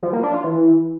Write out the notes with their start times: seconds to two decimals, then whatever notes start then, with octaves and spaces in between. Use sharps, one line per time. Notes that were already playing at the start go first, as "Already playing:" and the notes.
0.03 F3
0.13 A#3
0.23 D4
0.34 F4
0.44 E3